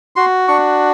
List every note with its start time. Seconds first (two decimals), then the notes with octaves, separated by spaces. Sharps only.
0.16 F#4 C6
0.48 D4 C#6